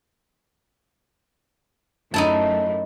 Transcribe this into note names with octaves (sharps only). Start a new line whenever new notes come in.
F#2 A3 D#4 E4 A5